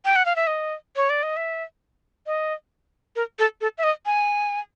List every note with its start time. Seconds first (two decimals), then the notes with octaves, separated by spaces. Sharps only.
0.05 G5
0.16 F#5
0.25 F5
0.36 E5
0.47 D#5
0.96 C#5
1.10 D5
1.23 D#5
1.37 E5
2.27 D#5
3.16 A#4
3.39 A4
3.61 A4
3.78 E5
3.83 D#5
4.06 G#5